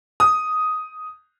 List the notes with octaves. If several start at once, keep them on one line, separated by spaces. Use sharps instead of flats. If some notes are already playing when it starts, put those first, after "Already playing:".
D#6